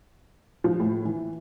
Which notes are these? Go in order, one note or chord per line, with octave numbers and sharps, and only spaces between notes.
F3
A2
E3